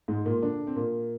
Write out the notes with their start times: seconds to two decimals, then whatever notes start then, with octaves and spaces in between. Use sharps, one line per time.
0.08 G#2 G#3
0.25 A#2 A#3
0.43 D3 D4
0.67 C4
0.76 A#2 A#3